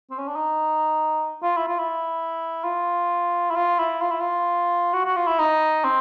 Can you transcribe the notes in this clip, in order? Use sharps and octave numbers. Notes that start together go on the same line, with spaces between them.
C4
C#4
D4
D#4
F4
E4
F4
E4
F4
E4
F4
E4
F4
E4
F4
F#4
F#4
F4
E4
D#4
C4